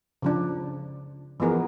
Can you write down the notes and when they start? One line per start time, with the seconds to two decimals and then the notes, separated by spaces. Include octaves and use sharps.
0.22 C#3 F3 D4
1.40 E3 F3 B3 G#4 A#4